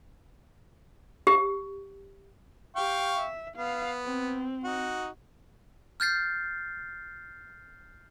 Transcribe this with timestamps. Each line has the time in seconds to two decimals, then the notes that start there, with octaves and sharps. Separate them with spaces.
1.27 G4
2.76 G4 F5 G5 C#6
3.17 E5
3.56 B3 F5
4.04 C4
4.64 D#4 F#4
6.00 F6 G6 A6 C7